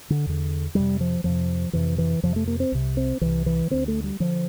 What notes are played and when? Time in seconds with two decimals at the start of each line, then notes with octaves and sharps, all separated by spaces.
0.10 D3
0.27 E2 D3
0.75 F2 C3 G3
1.01 F3
1.24 F2 C3 F3
1.73 F2 C3 E3
1.98 E3
2.23 F2 C3 F3
2.36 A3
2.47 A#3
2.60 C4
2.72 C2 C3
2.97 C4
3.21 C2 C3 E3
3.46 E3
3.70 D2 D3 C4
3.88 A3
4.04 G3
4.20 D3 F3